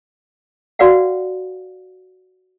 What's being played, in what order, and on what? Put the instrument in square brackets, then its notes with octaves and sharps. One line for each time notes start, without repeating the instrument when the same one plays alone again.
[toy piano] F#4 B4 D5 F5 F#5